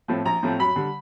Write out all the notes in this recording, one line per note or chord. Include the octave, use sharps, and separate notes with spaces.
A2 F3 A3 C4
A#1 A#5
A2 F3 A3 C4
F#2 B5
D3 G3